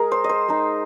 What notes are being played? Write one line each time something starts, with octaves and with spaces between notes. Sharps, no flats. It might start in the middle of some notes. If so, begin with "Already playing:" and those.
Already playing: G#3 G#4 A#4
C5
D#5
C5
G#3 D#4